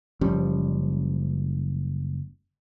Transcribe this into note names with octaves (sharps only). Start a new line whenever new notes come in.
F#1 F3 G3 C#4